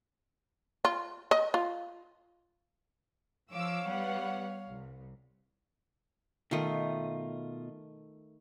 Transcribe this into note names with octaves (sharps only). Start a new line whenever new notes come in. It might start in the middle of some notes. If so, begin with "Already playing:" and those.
F4
D#5
F4
F3 C#5 F5 D6 E6
G3 B3 F#5
C2
B2 D#3 A3 F4 D#5